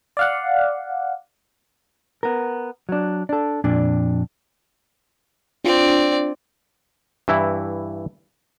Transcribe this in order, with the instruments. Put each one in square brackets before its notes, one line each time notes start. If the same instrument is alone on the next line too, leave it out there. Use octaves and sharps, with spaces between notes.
[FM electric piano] D5 F5 F#5
[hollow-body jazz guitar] B3 A#4
F#3 D4
D4 A4
F2 A#2 D4 D5
[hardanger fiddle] C4 D5 [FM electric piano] D4 F4
[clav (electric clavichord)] G2 E3 E4